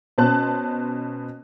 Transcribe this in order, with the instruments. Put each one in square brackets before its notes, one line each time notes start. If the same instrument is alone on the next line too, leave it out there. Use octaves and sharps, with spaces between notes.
[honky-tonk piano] B2 C#4 C5 A5 F#6